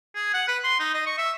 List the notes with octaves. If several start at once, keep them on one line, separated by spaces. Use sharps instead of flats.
G#4
F#5
B4
C6
D#4
D#5
C#6
E5